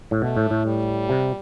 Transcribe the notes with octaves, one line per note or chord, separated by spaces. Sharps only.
A2
B2 A3
A2
A2
G3
C3